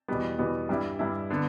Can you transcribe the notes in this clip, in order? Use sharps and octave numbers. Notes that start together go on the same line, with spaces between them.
E2 B2 G3 B3
E2 B2 G3 B3
G2 G3 E4
G2 G3 E4
D3 B3